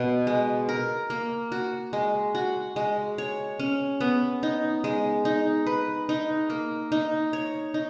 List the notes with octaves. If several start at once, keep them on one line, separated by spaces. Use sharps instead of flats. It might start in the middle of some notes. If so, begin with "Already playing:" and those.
Already playing: B2 B3
G#3
A#4
A#3
F#4
G#3
F#4
G#3
C#5
C#4
B3
D#4
G#3
D#4
B4
D#4
A#3
D#4
C#5
D#4